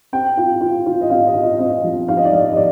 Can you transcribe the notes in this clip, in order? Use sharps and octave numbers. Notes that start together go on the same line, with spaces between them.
C4 G5
F4
F4
F4
D#5
C4 F5
D#5
F4
D#5
C4 D#5
F3
D#4 F5
D#5
D5
F3 D#5
D#5
D5